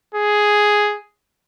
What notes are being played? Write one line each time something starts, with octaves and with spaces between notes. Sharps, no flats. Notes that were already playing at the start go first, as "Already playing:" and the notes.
G#4